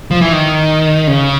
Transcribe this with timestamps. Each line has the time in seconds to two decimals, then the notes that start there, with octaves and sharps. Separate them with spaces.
0.11 F3
0.21 E3
0.32 D#3
1.07 C#3